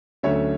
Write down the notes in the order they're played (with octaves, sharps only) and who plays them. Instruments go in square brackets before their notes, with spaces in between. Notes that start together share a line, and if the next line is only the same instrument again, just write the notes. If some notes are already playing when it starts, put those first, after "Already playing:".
[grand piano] D2 D3 F#3 A3 C#4 C#5 E5